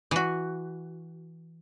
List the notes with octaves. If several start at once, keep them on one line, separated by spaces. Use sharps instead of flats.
E3 F#4